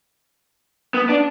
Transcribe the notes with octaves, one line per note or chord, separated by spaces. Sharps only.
B3
D4